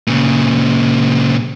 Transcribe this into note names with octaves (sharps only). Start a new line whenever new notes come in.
A#2 C#3